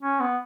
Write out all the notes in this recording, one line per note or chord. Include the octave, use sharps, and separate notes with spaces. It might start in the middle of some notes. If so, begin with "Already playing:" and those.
C#4
B3